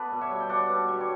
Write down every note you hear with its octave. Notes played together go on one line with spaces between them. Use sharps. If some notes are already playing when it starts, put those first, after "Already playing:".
Already playing: B3 A4 B4 D5
B2
C#5 E5
G3
G5
D4 D5 F#5
B2
G3
C#5